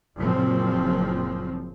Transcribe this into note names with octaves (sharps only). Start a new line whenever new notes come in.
F#1 A#2 F3 C4